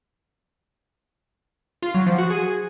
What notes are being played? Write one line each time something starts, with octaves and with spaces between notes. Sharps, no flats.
F4
F#3
F3
F#4
G#4